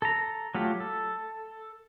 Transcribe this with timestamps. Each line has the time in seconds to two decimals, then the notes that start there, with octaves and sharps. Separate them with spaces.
0.02 A4 A#5
0.55 F#3 A3 F4 G4
0.80 A4